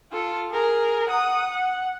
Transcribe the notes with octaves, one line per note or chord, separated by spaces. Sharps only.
F4 A4
G#4 A#4
F#5 D#6
F#5